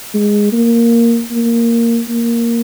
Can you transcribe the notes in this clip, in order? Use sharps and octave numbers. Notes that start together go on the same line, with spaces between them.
G#3
A#3
A#3
A#3